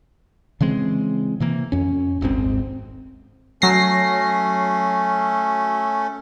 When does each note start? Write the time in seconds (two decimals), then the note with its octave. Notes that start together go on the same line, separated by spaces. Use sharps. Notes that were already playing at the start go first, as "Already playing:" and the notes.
0.61 C#3 E3 G#3 C4
1.40 C3 E3 A#3
1.72 F2 C#4
2.21 D#1 G#1 G#2 C4
3.62 F#3 A3 C#4 A#6 C7